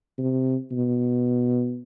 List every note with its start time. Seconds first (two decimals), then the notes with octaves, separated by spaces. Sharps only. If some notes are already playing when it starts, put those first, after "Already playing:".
0.18 C3
0.71 B2